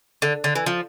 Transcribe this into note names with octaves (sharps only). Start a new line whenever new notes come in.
D3
D3
E3
F3